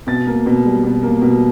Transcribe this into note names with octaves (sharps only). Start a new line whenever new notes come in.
B2 A6
A#3
B2
G3
B2
A#3
B2